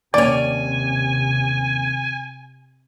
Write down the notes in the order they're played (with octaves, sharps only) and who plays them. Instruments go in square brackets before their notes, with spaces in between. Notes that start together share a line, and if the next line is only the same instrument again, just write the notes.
[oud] D#2 C#4 [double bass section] C3 [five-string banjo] D5 [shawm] G#5